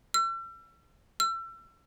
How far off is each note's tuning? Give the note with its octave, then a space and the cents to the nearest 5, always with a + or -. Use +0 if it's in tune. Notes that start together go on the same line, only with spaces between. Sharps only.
E6 +40
E6 +35